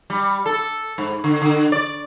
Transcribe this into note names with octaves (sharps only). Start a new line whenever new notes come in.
G3
A4
G#2
D3
D3
D5